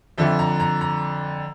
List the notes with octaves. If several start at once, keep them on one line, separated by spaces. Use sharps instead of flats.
F2 D3 F3 E5
A#5
A#5
A#5